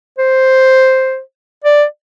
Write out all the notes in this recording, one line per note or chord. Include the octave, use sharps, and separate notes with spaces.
C5
D5